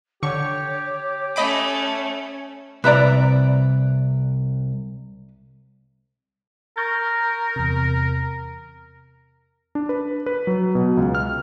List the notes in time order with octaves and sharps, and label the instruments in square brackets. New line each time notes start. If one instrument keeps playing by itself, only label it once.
[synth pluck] D3 C#6 C#7 [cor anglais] G4 [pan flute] C#5
[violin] A3 C#4 [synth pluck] D#5 B5 D6
[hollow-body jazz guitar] C2 E5 A#5 [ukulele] B4 D5
[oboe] A#4 [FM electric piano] C#6 G6 A6
[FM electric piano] E2 C3
[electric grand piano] D4
B4
B4
F#3
B2
C#2
F6